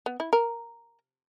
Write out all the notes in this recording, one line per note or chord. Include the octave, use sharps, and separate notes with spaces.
B3
E4
A#4